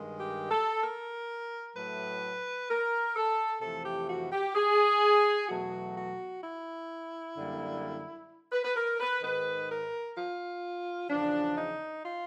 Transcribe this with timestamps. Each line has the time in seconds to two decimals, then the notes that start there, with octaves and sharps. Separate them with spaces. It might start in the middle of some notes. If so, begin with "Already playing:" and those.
Already playing: G2 D#3 G#3
0.19 G4
0.51 A4
0.82 A#4
1.75 A2 F#3 A3 B4
2.69 A#4
3.16 A4
3.61 F2 C3 E3 A3 A4
3.85 G4
4.08 F#4
4.32 G4
4.55 G#4
5.48 E2 B2 F#3 A3 F#4
5.95 F#4
6.43 E4
7.36 F#2 D3 G3 A#3
8.52 B4
8.64 B4
8.76 A#4
9.00 B4
9.22 G#2 D#3 G#3 B4
9.70 A#4
10.16 F4
11.09 E2 C#3 F3 D4
11.56 D#4
12.03 F4